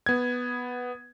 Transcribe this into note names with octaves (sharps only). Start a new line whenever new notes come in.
B3 G#6